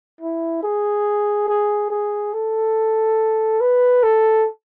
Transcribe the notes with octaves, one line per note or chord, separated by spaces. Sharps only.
E4
G#4
G#4
G#4
A4
B4
A4